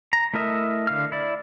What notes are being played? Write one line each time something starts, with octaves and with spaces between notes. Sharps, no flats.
A#5
A3 E4 A#4 D#5 E5
D3 F5 F6
E4 D5